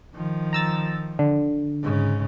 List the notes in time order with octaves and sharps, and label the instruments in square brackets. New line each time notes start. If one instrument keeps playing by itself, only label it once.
[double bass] D#3 F3
[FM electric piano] A#5 E6 A6
D3
[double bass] G#2 C#3